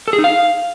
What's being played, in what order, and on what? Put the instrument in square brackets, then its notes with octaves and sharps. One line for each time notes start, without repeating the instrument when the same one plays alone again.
[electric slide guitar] A4
G#4
D#4
F5